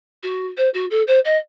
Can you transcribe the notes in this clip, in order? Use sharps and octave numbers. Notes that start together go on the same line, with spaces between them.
F#4
C5
F#4
A4
C5
D#5